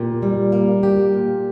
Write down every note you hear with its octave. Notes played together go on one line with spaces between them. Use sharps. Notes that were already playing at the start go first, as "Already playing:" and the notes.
Already playing: A#2 G4
G3
A#3
G4
A#2